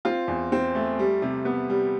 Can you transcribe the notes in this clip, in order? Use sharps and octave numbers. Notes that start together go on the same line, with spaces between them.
C4 F4
E2
C4
A3
G3
C3
B3
G3